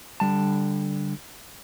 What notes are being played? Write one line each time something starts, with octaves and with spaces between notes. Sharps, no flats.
D3 G3 A5